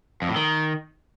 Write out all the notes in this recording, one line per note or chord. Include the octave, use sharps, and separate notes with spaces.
F2
A2
D#3